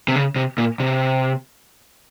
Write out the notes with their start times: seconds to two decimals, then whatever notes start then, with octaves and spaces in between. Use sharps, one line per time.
0.08 C3
0.16 C#3
0.36 C3
0.58 A#2
0.80 C3